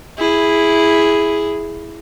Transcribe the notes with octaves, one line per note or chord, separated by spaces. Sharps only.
E4 G#4